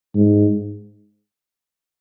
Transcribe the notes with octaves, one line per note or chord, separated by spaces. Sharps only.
G#2